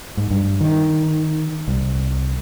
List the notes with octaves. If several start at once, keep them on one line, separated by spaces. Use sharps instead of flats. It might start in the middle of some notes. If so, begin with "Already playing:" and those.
G#2
G2
D#3
C2